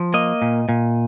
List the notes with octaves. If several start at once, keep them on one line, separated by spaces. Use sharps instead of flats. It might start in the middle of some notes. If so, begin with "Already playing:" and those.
Already playing: F3
A#3 D#5
A#2
A#2